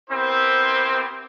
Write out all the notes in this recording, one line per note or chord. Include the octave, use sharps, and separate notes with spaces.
B3 C4 E4 G4 A#4 C5